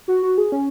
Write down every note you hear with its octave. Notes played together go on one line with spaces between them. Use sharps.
F#4
F#4
G#4
C#4